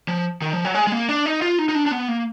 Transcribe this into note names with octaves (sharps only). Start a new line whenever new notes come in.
F3
D#3
F3
F#3
G#3
G#3
A#3
D4
D#4
F4
D#4
D#4
D4
D4
B3
A#3